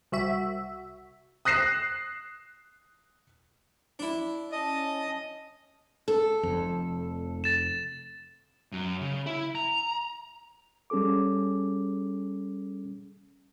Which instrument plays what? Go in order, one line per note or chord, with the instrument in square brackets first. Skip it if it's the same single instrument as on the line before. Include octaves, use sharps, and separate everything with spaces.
[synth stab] C2 F#4 E5
[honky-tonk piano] D#6 F#6 A#6 C7 E7
[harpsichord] D4 E4
[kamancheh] C#4 A5 [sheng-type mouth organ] D#5
[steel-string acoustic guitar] A4
[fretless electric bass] F1 F2
[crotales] A6 E7
[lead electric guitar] F#2
C#3
E4
A#5
[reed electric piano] G3 C#4 G#4 A4 D6